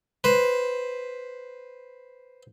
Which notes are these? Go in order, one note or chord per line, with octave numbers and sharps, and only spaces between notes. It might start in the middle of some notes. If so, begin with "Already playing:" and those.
B4 C5